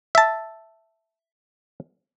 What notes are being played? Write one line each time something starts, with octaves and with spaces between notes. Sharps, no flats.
E5 A5